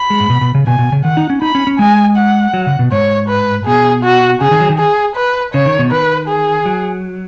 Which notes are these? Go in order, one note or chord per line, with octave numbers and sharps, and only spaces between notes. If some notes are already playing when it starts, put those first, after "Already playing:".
Already playing: B5
G#3
G#2
B2
B2
C#3
B2 G#5
B2
C#3
D#3 F#5
D#4
C#4
D#4 B5
C#4
C#4
G#3 G#5
F#5
F#3
C#3
B2
G#2 C#5
B4
B2 G#4
F#4
C#3 G#4
D#3
F#3
D#3
G#4
B4
C#3 C#5
D#3
B2
D#3 B4
G#4
F#3